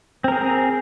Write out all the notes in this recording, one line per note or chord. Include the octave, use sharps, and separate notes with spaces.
C4 G#4 A#4